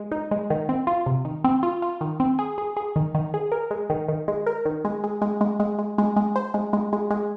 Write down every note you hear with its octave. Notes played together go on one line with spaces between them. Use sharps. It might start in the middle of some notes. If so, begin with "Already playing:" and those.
Already playing: G#3
D#4
G#3
D#3
C4
F4
C3
D#3
C4
F4
F4
D#3
C4
G#4
G#4
G#4
D#3
D#3
G#4
A#4
G#3
D#3
D#3
G#3
A#4
D#3
G#3
G#3
G#3
G#3
G#3
G#3
G#3
G#3
C5
G#3
G#3
G#3
G#3